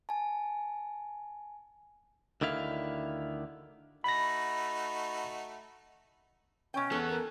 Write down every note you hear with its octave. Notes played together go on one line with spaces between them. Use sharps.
G#5 A5
D2 D3 D#3 E4 F5
A3 D#4 F#4 B5 A#6
B2 C#4 G5
E2 B3 A4
A#4